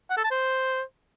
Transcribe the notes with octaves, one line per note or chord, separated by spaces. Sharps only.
F#5
A4
A5
C5